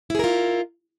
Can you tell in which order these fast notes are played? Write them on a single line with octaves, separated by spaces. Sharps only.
E4 G#4 A#4 F4